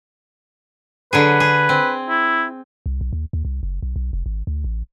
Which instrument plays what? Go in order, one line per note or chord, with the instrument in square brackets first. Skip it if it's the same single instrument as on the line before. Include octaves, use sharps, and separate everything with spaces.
[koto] D3 F#3 G#4 [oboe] B4
[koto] G#4
C4
[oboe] E4
[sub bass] C2
B1
D#2
D#2
C2
F#1
B1
B1
F1
G#1
D2
A1